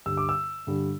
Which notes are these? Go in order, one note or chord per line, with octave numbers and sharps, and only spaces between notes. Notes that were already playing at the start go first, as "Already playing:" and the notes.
G2 D3 G3 E6
D6
E6
G2 D3 G3